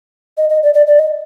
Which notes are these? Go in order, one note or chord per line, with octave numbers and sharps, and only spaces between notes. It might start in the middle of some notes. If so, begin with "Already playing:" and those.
D#5
D#5
D5
D5
D5
D#5